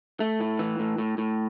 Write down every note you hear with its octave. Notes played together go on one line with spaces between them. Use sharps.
A3
A2
E3
A2
A2
A2